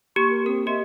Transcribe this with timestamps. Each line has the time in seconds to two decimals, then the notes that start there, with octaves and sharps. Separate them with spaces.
0.16 A#3 G4 C#6
0.30 A#4
0.46 C4 A#4
0.67 G4 D#5 E5 C6